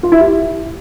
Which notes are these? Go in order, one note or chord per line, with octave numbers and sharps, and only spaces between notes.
F4
E4
G4